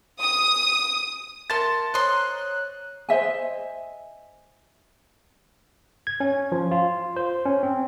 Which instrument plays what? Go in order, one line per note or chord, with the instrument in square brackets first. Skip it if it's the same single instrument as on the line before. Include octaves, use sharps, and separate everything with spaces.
[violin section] D#6
[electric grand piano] A#4 E5 [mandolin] A5 C6 [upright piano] A6 C#7
[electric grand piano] C5 C#5 A#5 [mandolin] D#5 C6 [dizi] F#6
[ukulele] C5 D#5 E5 G#5
[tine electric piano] G#6
C#4
F3
F4
C5
C#4
C4